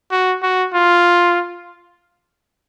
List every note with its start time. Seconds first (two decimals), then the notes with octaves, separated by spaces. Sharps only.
0.11 F#4
0.42 F#4
0.74 F4